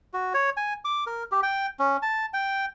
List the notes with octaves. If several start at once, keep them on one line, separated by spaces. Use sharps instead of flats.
F#4
C#5
G#5
D6
A#4
G4
G5
C#4
A5
G5